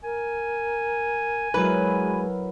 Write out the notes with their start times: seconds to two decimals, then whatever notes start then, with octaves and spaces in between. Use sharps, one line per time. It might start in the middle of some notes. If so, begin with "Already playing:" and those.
0.04 A#4 G#5
1.54 F#3 G#3 E4 A#4 B4